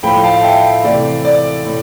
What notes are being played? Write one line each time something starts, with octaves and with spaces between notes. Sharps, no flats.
A2 F3 A3 G5 B5
F5 A5
E5 G5
C3 E3 A3 D5
D5
A2